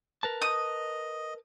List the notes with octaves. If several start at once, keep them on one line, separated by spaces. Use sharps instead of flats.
A#4 B4 A5
D#5 D#6